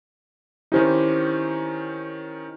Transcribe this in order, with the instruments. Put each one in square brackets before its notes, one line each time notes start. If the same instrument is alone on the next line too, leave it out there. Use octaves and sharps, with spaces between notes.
[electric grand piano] D#3 C#4 D#4 [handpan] E4 G4 C5